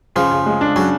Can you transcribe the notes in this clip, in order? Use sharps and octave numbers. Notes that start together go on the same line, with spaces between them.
C#3 F3
C#3
G#3
D4
C#3 F#3